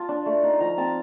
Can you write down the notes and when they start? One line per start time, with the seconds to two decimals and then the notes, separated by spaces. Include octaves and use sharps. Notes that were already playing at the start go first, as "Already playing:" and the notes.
Already playing: F4 A5
0.09 D4
0.26 A3
0.43 D#4
0.60 F3 A#5
0.77 C4 A5